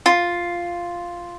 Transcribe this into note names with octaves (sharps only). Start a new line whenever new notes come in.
F4